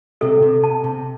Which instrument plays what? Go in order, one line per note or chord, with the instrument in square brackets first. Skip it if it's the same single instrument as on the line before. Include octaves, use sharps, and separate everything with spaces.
[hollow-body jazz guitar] C3 [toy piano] A4
[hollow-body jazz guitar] C3
[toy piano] A5
[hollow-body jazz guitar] C3